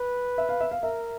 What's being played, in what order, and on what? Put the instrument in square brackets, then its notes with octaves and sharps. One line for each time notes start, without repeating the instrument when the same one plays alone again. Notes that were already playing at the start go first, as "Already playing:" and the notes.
Already playing: [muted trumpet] B4
[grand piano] E5
F5
E5
F5
[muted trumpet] A#4 [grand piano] E5